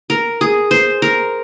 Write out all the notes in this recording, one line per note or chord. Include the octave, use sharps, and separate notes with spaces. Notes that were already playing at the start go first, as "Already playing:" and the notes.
A#4
G#4
C5
A#4